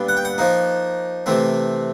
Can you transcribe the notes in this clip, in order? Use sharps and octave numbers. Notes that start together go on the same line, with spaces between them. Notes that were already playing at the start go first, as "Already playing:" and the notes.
Already playing: A#2 G3 B3 D4
F#5
G5
F#5
F3 A#3 D#4
C3 E3 A3 C4